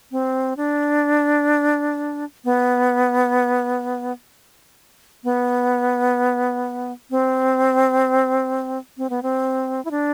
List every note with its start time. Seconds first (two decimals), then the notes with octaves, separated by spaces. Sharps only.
0.12 C4
0.57 D4
2.45 B3
5.24 B3
7.11 C4
8.98 C4
9.10 B3
9.23 C4
9.85 E4
9.91 D4